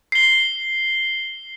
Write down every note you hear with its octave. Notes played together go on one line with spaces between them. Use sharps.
C7 G7